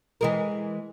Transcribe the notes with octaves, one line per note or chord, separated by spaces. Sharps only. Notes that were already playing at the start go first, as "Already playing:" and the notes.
E3 G#3 A#4